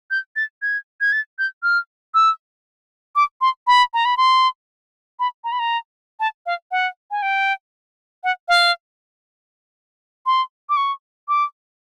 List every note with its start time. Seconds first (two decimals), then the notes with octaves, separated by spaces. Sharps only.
0.11 G6
0.36 A6
0.62 G#6
1.01 G#6
1.12 A6
1.39 G6
1.63 F6
2.14 E6
3.16 D6
3.41 C6
3.67 B5
3.94 A#5
4.05 B5
4.17 C6
5.20 B5
5.44 A#5
5.52 B5
5.59 A#5
6.20 A5
6.46 F5
6.71 F#5
7.11 G#5
7.22 G5
8.24 F#5
8.48 F5
10.26 C6
10.70 D6
10.77 C#6
11.29 D6